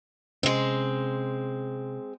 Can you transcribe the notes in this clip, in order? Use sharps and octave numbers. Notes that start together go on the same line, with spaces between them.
C3 G#3 C4 C#4